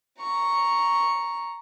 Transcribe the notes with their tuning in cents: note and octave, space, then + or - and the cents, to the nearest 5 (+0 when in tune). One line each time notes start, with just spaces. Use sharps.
A#5 +0 C#6 +0